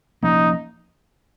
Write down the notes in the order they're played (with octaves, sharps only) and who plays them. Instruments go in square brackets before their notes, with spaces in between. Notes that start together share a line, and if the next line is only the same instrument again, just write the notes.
[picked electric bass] F3 A#3 C#4 [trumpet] D#4